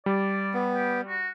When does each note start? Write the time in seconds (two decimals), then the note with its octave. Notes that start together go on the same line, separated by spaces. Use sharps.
0.06 G3 D5
0.54 B3
0.73 G4
1.08 F#4